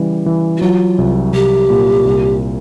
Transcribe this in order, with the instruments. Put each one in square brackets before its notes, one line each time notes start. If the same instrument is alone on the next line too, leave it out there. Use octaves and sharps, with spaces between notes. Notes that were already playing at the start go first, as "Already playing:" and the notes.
Already playing: [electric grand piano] C#3 E3 G3
E3
[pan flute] F#4
[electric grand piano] F#3 [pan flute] F4
[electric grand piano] C2
[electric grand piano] C2 [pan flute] G4
[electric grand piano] A#2
C2